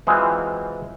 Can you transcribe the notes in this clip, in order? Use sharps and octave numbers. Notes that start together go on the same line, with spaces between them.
E3 F#3 G#3 C4 F4